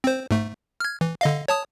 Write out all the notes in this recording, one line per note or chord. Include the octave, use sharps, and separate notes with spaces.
C4 C5
G#2 A3
F6 G#6
E3
D3 D#5 F5
C#5 A5 D#6